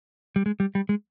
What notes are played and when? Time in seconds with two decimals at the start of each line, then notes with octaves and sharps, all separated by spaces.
0.36 G3
0.46 G#3
0.60 G3
0.75 G3
0.89 G#3